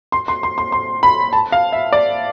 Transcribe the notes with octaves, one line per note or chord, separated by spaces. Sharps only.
C6
C6
C6
C6
C6
B5
A5
F5
E5
D5